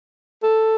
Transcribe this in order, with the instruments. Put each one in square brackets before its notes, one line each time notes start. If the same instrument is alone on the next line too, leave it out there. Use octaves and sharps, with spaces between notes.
[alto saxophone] A4